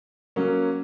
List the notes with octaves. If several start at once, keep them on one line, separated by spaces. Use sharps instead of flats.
F#3 A#3 C#4